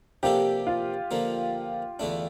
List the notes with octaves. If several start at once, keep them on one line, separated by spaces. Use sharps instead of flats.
C3 F3 A#3 D4 G4 A4
F4
D3 F3 A#3
E2 D3 A3 D4